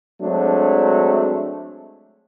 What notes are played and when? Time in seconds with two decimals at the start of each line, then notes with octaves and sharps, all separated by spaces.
0.22 F#3 G#3 A3 C4 D4